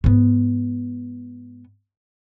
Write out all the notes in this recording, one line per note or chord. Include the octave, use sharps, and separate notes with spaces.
G#2 B3